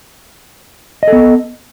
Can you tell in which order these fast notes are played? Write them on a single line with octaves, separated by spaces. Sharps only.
D#5 A4 B3